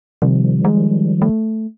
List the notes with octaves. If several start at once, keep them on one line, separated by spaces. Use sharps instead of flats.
C3 D#3 F3 G3
G#3
A3